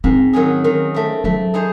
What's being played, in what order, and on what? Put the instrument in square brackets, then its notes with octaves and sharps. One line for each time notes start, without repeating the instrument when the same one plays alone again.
[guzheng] G#2 [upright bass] C4
[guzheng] D#3 F#3 C#4 G#4
D#3
A3 C4
[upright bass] F#3 [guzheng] A3
[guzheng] D#4 G#4 C5